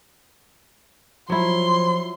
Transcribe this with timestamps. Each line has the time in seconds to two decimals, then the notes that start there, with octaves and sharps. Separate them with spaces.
1.30 F3 F#3 E4 C6